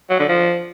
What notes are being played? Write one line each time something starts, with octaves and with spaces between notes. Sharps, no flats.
F#3
D3
F3